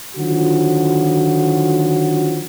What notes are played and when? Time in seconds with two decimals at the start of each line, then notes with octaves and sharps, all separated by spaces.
0.17 D3 D#3 F3 F#3 F4 F#4